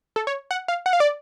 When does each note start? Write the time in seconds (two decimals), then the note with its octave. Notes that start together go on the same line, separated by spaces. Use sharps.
0.16 A4
0.27 C#5
0.51 F#5
0.68 F5
0.86 F#5
0.93 F5
1.00 D5